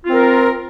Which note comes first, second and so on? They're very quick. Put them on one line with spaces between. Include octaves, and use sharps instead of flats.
F4 C4 A#4